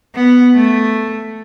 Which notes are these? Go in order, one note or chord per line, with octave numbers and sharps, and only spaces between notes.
B3
A3